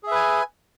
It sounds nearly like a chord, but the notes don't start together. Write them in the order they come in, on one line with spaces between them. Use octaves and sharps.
G#4 E5 B4 G#5